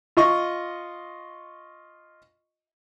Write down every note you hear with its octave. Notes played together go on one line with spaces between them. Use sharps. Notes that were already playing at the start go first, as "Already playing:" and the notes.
F4 D#5 C#6